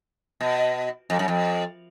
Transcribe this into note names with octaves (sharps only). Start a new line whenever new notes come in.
B2
F2
F#2
F2